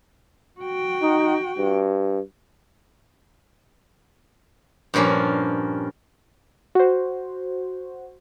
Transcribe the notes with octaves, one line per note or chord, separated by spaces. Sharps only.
F#4 G5
D#4
G2
G2 A#2 F3 A#3 C#4
F#4 C5